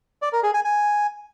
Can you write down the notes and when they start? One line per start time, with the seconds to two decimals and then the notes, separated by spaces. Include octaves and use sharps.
0.22 D5
0.33 A#4
0.43 G#4
0.54 G#5
0.65 G#5